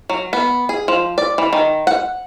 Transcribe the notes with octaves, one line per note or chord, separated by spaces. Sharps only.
F#3
B3
G#4
F3
D5
E3
D#3
F#5